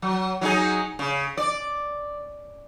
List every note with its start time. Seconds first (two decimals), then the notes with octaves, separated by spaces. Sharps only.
0.02 F#3
0.41 F#3 D#4 G#4
0.99 C#3
1.37 D5